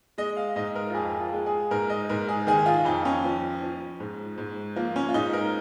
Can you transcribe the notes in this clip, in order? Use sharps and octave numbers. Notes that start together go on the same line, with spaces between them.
G#3 D#5
F5
G#2 D#5
A#4
F4
F2 G#4
F4
G#3
G#4
G#2 A#4
D#5
G#2 A#4
G#4
D#3 G#4
F4
F2 D#4
C#4
F3
F3
G#2
G#2
F3 A#3
C#4
F4
G#2 D#4
A#4